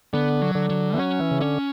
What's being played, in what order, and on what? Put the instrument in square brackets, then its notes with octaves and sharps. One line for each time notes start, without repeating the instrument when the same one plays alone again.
[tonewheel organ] D3 [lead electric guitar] B3
[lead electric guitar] F#3
[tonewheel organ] D3
[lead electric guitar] F#3
[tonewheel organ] E3
[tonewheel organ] F#3 [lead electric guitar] C#4
[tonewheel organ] E3
C#3
[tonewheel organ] D3 [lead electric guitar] C#4